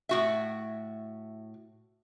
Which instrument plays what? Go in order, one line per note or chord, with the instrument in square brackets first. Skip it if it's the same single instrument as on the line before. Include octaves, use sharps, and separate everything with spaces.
[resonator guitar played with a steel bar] A2 F#4 E5